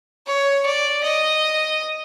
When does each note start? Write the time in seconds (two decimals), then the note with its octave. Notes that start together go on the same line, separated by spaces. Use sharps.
0.27 C#5
0.66 D5
1.03 D#5